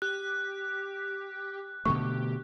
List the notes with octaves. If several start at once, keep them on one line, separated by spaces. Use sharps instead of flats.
G4 F#6
B2 D3 A3 G4 C#6